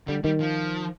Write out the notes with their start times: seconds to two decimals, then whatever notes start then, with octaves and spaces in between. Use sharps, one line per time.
0.08 D3 G3
0.24 D#3 G3
0.40 F3